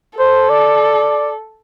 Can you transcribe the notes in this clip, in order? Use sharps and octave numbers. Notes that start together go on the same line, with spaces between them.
A4 C5
D5